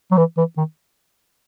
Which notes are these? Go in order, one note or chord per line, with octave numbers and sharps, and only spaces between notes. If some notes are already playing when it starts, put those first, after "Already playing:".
F#3
E3
E3
D#3